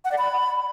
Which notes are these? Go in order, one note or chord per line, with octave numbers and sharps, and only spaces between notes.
F#5
D5
B5